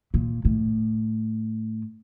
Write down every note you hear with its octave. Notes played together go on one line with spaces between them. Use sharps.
A#2
A2